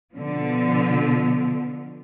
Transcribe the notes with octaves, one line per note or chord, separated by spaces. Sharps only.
B2 D3 F3